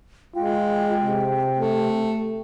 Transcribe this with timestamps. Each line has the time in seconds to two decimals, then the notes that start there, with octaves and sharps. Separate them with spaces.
0.36 G#3 F4 G5
1.02 C3
1.57 A3